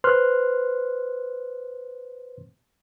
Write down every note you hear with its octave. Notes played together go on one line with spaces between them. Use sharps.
B4 C5 C6 F6 F#6